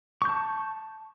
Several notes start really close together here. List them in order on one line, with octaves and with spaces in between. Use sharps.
C#6 G6 A5